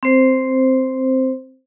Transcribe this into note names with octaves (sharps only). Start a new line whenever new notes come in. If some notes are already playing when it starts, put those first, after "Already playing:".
C4 C5